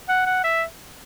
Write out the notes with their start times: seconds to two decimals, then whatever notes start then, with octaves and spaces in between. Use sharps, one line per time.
0.09 F#5
0.26 F#5
0.44 E5